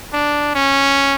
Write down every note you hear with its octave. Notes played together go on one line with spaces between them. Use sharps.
D4
C#4